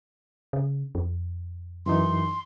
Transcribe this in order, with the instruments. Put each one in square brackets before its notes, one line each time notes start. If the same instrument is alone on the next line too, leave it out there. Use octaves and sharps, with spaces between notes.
[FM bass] C#3
F2
[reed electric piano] F#2 E3 D#4 [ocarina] C6